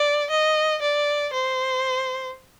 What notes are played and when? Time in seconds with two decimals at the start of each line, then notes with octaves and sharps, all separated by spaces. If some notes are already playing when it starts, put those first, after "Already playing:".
Already playing: D5
0.31 D#5
0.82 D5
1.33 C5